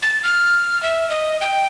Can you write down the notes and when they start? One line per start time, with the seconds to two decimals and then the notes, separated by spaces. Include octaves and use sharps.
0.02 A6
0.24 F6
0.83 E5
1.10 D#5
1.41 G5